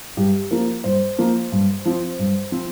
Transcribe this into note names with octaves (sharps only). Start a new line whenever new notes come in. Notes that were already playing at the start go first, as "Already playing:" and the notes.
G2 G4
F3 A#3 A#4
G2 C5
F3 A#3
G2
F3 C4
G2
F3 C4